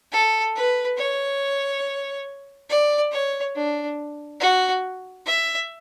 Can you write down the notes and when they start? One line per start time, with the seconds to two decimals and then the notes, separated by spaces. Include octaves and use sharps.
0.12 A4
0.56 B4
0.98 C#5
2.70 D5
3.12 C#5
3.56 D4
4.40 F#4
5.26 E5